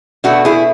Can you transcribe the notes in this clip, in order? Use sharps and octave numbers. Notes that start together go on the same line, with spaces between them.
B2 A3 D4 F#4
E4 G#4